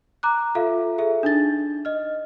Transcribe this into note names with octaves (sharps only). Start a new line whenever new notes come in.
A#5 D6 F#6
F4 A4 E5 F5
G#4 A4 E5
D4 D#4 A6
D#5 F6